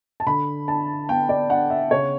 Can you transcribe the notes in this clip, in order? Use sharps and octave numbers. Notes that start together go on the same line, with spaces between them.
A5
D3 B5
D4 A5
B3 G5
D5
D4 F#5
E5
C#3 C#5